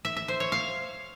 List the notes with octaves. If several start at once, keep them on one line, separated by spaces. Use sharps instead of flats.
E5
E5
C5
C#5
F5